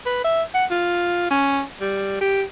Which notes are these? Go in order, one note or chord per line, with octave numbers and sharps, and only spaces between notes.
B4
E5
F#5
F4
C#4
G3
G4